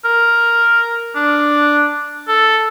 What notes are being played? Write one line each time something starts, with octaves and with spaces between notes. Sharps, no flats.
A#4
D4
A4